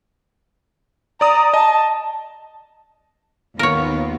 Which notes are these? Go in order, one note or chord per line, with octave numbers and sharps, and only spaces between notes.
D5 A#5 D#6
D#5 A5
D#2 B3 F4 A#4 C#5